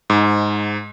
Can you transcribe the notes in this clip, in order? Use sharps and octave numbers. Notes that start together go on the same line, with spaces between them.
G#2